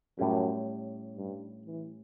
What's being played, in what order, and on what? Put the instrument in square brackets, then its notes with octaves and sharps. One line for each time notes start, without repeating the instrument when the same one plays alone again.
[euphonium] F#2 [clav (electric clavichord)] A2 G3 C#4 G4
[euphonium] G2
E3